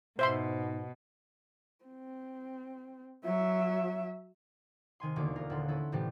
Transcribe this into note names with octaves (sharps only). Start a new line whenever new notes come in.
G#2 B2 C5 E5 C6
C4
F#3 E5
C3 D#3 G#5 C6
E1 D#2 D3 A#3 F#4 D6
F4 A#4
D#1 A4 F#5 C6
C#4 E4 A4
A2 C3 E3 G3 A3 G4